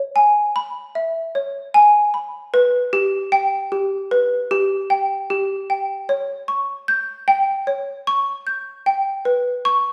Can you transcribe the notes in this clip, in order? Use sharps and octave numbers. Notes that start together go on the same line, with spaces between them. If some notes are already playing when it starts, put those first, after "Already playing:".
Already playing: C#5
G#5
B5
E5
C#5
G#5
B5
B4
G4
G5
G4
B4
G4
G5
G4
G5
C#5
C#6
G6
G5
C#5
C#6
G6
G5
B4
C#6